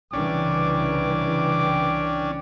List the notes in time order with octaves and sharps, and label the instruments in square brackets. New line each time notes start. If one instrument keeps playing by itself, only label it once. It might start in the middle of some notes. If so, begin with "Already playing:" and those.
[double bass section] C2 C#3 E3 [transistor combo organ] C#4 D4 [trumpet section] G5 D6